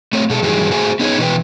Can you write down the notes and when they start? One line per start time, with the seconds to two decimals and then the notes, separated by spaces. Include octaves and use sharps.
0.13 A3 C4 A4 C#5
0.29 B2 G#3 A4
0.42 G2 D#3 E3 F#3 G3 G#4
0.71 A3 F#4 G#4 C5 G#5
1.00 B3 C#4 D#4 G#4 A#4 C#5
1.18 B2 E3 A4 B4 G5